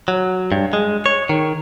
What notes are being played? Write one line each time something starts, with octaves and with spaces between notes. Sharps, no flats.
F#3
G2
G#3
C#5
D#3